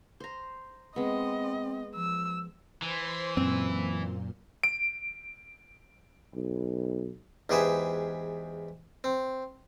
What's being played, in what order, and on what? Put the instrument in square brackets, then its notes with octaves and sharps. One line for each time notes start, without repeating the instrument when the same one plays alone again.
[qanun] C5 A#5
[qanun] G#3 B3 [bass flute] C4 [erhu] D#5
[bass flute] F3 [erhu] E6
[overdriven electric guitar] E3 [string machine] C5 C6
[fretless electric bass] F#2 [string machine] A#2 [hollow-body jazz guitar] C4
[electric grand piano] D7
[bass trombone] B1
[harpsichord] E2 G#2 G4 G#4 B4 E5
C4